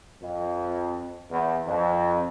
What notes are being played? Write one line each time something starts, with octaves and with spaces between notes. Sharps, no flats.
F2
E2
F2